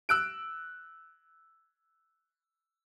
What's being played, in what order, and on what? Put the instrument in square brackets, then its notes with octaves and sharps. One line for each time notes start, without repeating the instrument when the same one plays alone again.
[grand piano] E6 F#6 D7